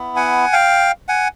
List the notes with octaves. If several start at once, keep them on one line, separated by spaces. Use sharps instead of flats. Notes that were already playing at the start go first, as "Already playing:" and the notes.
Already playing: B3 E4
F#5 G#5
F5 G5
F#5 G#5